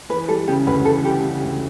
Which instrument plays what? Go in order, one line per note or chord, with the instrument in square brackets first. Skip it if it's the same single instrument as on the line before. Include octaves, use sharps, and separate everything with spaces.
[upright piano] E3 [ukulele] B4
[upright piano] G3 [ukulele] A4
[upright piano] C#3 [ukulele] G4
[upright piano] D2 [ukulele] B4
[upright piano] E3 [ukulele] A4
[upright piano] G3 [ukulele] G4
[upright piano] C#3
D2